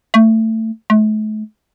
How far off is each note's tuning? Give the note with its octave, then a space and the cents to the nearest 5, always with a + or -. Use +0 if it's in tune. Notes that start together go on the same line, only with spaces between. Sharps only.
A3 +20
A3 -40